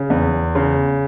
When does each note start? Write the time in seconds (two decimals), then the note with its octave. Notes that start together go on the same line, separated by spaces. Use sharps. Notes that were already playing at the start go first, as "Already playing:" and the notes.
Already playing: C#3
0.10 E2
0.55 C#3